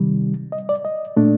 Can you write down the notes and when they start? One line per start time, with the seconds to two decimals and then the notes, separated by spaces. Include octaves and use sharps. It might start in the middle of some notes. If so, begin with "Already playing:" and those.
Already playing: C3 D#3 G3
0.52 D#5
0.69 D5
0.85 D#5
1.17 A#2 A3 D4